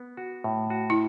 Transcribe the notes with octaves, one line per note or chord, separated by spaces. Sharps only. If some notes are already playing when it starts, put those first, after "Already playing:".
Already playing: B3
F#4
A2
F#4
E4